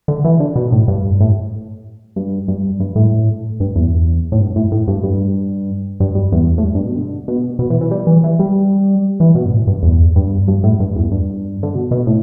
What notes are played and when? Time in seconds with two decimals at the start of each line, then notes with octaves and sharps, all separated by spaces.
0.08 D3
0.24 E3
0.40 D3
0.56 B2
0.72 A2
0.88 G2
1.20 A2
2.16 G2
2.48 G2
2.80 G2
2.96 A2
3.60 G2
3.76 E2
4.32 A2
4.40 G2
4.56 A2
4.72 A2
4.88 G2
5.03 G2
6.00 G2
6.15 G2
6.32 E2
6.58 A2
6.64 G2
6.75 G2
6.85 B2
6.96 D3
7.28 B2
7.59 B2
7.70 E3
7.81 E3
7.91 G3
8.07 E3
8.24 E3
8.39 G3
9.20 E3
9.35 B2
9.46 G2
9.52 A2
9.67 G2
9.83 E2
10.15 G2
10.48 G2
10.63 A2
10.80 G2
10.96 E2
11.12 G2
11.63 D3
11.75 B2
11.91 B2
12.07 A2